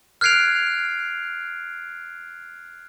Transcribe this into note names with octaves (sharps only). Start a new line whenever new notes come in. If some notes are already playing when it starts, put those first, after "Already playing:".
F6 F#6 G#6 C7 D7 F7